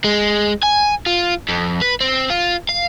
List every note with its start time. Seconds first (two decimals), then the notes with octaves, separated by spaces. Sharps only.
0.04 G#3
0.63 G#5
1.07 F4
1.49 F2
1.82 B4
2.01 C4
2.30 F4
2.69 F5